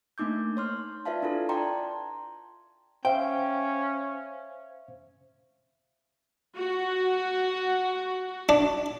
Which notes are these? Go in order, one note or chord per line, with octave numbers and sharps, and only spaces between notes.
A3 A#3 D4 D#4 D6 G6
C#5 C6 F6
F4 B4 D5 E5 F5 A5
D4 E4 F4 A4
D5 G5 A5 A#5 C6
C#4 C5 E5 F5 G5
F#4
D4